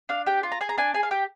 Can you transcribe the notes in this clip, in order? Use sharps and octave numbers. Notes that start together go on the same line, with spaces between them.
D4 F5
G4 G5
F4
A#5
G#4 G#5
A#5
D4 G#5
G#4 G#5
F5
G4 G5